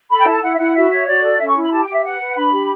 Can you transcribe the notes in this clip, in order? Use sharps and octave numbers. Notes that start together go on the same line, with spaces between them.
A4 B5
G5
E4 A5
E4 F#5
E5
E4 F#5
F#4 E5
C#5
F#4 D5
A4
C#4 E5
C#6
E4
B5
G4 A5
G5
G4
E5
B4 F#5
B4
D4 B5
G4